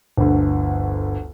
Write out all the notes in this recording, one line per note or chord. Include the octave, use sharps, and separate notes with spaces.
G1 D2